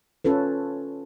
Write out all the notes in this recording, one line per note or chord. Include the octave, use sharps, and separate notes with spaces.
C#4 F4 A4 B4